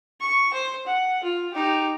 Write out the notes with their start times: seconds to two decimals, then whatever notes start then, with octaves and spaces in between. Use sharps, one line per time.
0.21 C#6
0.53 C5
0.86 F#5
1.24 F4
1.54 D#4 G4